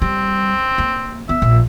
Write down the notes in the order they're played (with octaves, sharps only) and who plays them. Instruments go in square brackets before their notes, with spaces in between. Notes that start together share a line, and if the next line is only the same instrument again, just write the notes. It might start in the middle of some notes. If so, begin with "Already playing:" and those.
[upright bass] G3 [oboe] C4
[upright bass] A#3
[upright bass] B3 [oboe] E5
[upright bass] A#1